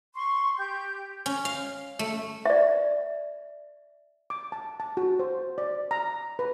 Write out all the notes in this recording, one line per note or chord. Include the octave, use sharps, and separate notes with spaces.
C6 C#6
G4 G6
C#4
F5
A3
D5 E5
D6
A5
A5
F#4
C5
D5
A#5
B4